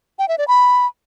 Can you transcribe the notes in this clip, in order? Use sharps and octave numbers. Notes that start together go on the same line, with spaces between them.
G5
E5
D5
B5